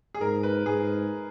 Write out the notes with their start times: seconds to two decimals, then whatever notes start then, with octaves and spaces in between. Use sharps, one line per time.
0.14 G#4
0.21 G#2 A#4
0.43 B4
0.66 G#2 G#4